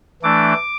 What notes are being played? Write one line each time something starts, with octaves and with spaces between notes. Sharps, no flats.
E3 A3 D4 D6